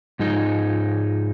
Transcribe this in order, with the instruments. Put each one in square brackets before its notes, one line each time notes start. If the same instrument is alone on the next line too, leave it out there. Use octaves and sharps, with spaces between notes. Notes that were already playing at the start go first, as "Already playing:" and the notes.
[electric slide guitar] G#2 F3 G#3 D#4